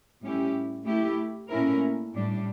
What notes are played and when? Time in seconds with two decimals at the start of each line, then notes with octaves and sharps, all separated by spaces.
0.22 A2 G3 C#4 E4 G4
0.85 A3 E4 G4
1.49 A#2 A3 C#4 E4 A#4
2.14 A2 G3 D4